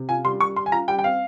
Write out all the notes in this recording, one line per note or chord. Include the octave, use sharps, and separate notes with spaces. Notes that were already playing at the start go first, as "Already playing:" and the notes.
Already playing: C3
F4 G#5
G3 C6
G3 C#6
G3 C6
G#5
F4 A#5
G3 G5
G5
C4 F5